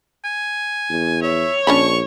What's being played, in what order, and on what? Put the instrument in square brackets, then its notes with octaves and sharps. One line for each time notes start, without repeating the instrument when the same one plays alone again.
[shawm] G#5
[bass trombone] E2
[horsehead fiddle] C#5 [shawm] E5
[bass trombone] A#1 [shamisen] C#4 D4 B5 [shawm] C#6